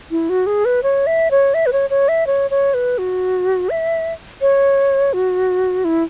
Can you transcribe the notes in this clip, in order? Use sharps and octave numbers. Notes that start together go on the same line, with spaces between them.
E4
F#4
G#4
B4
C#5
E5
C#5
E5
B4
C#5
C#5
E5
C#5
C#5
B4
F#4
E5
C#5
F#4
E4